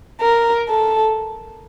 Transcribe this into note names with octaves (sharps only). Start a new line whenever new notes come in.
A#4
A4